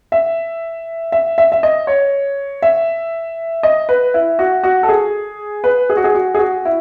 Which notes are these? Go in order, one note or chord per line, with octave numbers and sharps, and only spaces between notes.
E5
E5
E5
E5
D#5
C#5
E5
D#5
B4
E4
F#4
F#4
A4
G#4
B4
G#4
F#4
G#4
F#4
G#4
F#4
E4